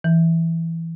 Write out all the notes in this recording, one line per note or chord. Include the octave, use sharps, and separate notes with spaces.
E3